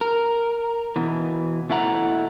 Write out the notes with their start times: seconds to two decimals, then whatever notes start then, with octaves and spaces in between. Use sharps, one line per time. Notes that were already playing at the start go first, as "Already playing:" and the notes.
0.01 A#4
0.96 B2 E3
1.70 B2 A3 E4 F#5 A#5